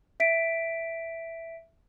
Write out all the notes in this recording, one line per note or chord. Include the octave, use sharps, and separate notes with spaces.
E5 B6 D7